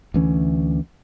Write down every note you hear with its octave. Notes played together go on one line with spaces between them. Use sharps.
D2 E3 C#4